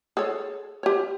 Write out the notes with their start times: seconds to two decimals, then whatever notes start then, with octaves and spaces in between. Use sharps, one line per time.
0.17 G#4 A4 C#5
0.83 G4 C#5